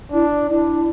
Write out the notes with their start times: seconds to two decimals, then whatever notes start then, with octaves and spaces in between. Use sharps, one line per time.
0.12 D4 E4
0.48 D4 E4